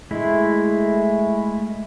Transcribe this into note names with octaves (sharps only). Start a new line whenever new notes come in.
G#3 A3 E4